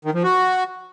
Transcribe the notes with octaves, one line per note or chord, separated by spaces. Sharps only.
D#3
F3
F#4